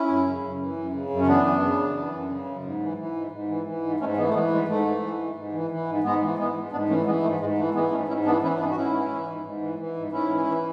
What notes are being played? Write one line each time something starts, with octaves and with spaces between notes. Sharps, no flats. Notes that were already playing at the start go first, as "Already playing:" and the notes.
Already playing: C#4 E4
F#2
C#3
F#2
E3
F#2
C#3
F#2
C#4
E3 B3 D4
F#2
C#3
F#2
E3
F#2
C#3
F#2
G#2
E3
E3
G#2
G#2
E3
E3
G#2
G#2 A3 C#4
E3 G#3 B3
A3
E3 G#3 B3
G#2 G#3
G#2 A3
E3
E3
G#2
G#2
E3
E3
G#2
G#2 G#3 B3
E3
E3 G#3 B3
G#2
G#2 B3 D4
E3 A3 C#4
E3 G#3 B3
G#2 A3
G#2 G#3
E3 A3
E3 G#3 B3
G#2 A3 C#4
G#2 C#4 E4
E3 B3 D4
E3 C#4 E4
G#2 B3 D4
F#4
G#2 C#4 E4
E3
E3
G#2
G#2
E3
E3
G#2
G#2 C#4 E4
E3
E3